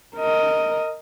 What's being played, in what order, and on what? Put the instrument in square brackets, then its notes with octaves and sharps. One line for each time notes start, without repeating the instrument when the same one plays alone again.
[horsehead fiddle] A#4 D#5